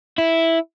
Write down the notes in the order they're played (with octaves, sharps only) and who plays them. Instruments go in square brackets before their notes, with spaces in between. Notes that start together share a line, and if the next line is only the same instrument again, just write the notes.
[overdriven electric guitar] E4